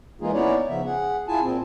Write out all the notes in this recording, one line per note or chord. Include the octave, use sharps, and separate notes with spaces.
E3 G#3 A#3 D#4 F4 G#4
B3 C#4 D#4 E4 C#5 D5
C#3 F3 B3 E5
G#4 F#5
E4 F4 G#4 G#5 A5
A#2 C4